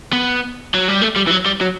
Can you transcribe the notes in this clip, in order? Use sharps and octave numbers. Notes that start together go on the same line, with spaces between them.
B3
F#3
G3
A3
G3
E3
F#3
G3
F#3